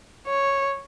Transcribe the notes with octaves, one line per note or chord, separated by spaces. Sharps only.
C#5